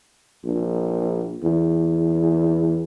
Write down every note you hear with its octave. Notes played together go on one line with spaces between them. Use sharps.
A#1
E2